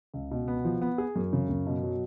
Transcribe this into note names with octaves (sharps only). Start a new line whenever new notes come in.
C#2
B2
B3
F3
B3
G#4
F#2
C#3
F#2
B2
F#3